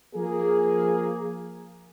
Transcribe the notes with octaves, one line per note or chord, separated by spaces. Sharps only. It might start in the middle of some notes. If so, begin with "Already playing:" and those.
F3 A#3 G#4